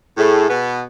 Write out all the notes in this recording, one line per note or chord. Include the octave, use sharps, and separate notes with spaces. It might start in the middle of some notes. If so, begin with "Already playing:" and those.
A2 A3 G#4
B2 B3